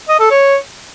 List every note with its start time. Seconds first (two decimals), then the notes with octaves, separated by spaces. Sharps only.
0.09 D#5
0.19 A4
0.30 C#5